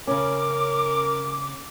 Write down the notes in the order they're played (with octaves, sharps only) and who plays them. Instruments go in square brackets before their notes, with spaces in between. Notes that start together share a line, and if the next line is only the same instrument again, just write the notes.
[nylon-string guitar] C#3 C#4 [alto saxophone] A#4 [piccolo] D6